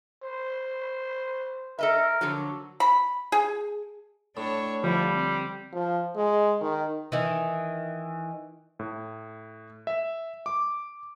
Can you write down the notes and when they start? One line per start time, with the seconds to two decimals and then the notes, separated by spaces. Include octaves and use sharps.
0.23 C5
1.79 A4 A#4 D#5 E5
2.21 D3 F3 F#3
2.80 B5
3.32 G#4
4.37 A2 D4 C#5
4.84 D3 F3 G3 E4
5.14 C4
5.73 F3
6.16 G#3
6.61 D#3
7.12 D#3 E3
8.79 A2
9.87 E5
10.46 D6